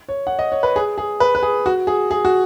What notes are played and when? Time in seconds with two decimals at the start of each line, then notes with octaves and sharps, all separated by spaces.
0.09 C#5
0.27 F#5
0.39 D#5
0.52 C#5
0.63 B4
0.76 G#4
0.98 G#4
1.20 B4
1.35 B4
1.43 G#4
1.66 F#4
1.87 G#4
2.11 G#4
2.25 F#4